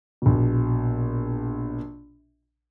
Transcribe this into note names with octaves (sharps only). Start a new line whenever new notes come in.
A#1 B2